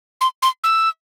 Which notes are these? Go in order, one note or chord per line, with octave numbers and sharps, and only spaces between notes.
C6
C6
E6